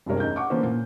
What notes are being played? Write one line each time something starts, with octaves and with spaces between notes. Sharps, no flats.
G1 C#2 C3 A#4 C#5
E2 A3 C#4 D#4 G6
F#5 C#6 D6
D3 E3 A#3 B3 C#4 C5
A#2